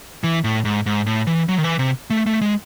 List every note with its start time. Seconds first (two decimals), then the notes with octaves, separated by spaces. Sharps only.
0.24 E3
0.44 A2
0.65 G#2
0.86 G#2
1.06 A2
1.27 E3
1.49 F#3
1.58 D#3
1.64 E3
1.79 C3
2.10 A3
2.26 A3
2.41 G#3